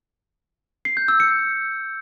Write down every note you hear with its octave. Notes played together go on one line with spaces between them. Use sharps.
C7
G6
E6
C#7